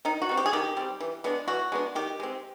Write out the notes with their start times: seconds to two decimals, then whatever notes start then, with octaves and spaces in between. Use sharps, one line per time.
0.05 D#3 D#4
0.22 F#4
0.29 G3 C4
0.37 G4
0.46 G#4
0.53 D#3 G4
0.77 G3 C4
1.01 E3
1.24 G#3 B3 D4
1.48 E3 F#4
1.72 G#3 B3 D4
1.95 D#3 G4
2.20 G#3 C4